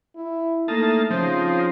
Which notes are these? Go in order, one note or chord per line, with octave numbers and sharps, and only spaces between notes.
E4
A3 A#3 D#4 A5
C#3 F3 C4 D#4